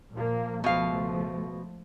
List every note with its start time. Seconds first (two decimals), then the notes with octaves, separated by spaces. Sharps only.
0.14 A#2 F3 A#3
0.64 C#2 B2 F3 A3 F5